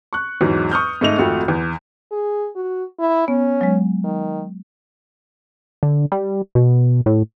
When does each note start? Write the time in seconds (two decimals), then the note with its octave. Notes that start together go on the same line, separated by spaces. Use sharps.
0.13 C#6 F#6
0.41 E2 G#2 F#3
0.71 C#6 D#6 F6 G6
1.01 G#2 A3 D#5 F7
1.18 G#1 F2 A3 F#4
1.48 E2
2.11 G#4
2.56 F#4
2.99 E4
3.28 B3 C#4
3.61 F#3 G#3
4.04 D#3
5.83 D3
6.12 G3
6.55 B2
7.06 A2